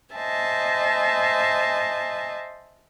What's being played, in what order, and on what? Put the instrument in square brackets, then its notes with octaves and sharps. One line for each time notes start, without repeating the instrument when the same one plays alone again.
[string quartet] C5 D#5 E5 G#5 A5